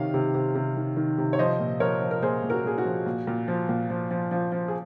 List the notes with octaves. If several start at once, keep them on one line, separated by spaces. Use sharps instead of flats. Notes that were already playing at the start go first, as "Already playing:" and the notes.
Already playing: C3 D#3 C#5 F5
C3
C3
C3
D#3
D#3
C3
C#5
F3 C5 D#5
A#2
F3 A#4 C#5
F3
A#4
A#2 G#4 C5
A#2
F#4 A#4
A#2 G#4
F#4
F3
A#2
A#2
F3
A#2
F3
F3
F3
F3
G#4